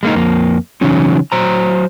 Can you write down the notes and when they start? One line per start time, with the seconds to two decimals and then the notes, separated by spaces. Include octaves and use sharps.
0.03 G#3 A#3 D#4
0.15 F2 A#3
0.81 C#3 E3 F#3 C#4 D#4
1.32 F#3 C5 A#5